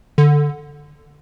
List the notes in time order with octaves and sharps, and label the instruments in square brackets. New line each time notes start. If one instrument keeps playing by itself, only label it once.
[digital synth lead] D3